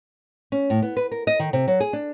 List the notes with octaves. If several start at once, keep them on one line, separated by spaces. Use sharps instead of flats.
C#4
A2
B3
B4
A#4
D#5
D#3
C3
F#3
G#4
D4